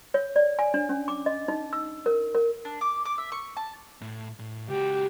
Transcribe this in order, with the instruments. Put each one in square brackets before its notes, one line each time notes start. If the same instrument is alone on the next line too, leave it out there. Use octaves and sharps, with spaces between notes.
[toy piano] C#5
D5
G#5
D4
C#4
D6
D#5
D#4
E6
A#4
A#4
[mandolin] D4
D6
D6
E5
C#6
A5
[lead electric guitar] A2
A2
[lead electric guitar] C#2 F#4 [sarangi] G4